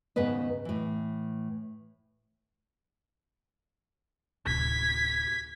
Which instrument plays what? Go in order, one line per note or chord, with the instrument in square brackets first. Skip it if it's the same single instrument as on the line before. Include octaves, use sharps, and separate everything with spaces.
[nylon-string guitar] D#2 G#2 C#3 B3 B4 D#5
A2 E3
[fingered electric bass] D1 C3 [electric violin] G#6 B6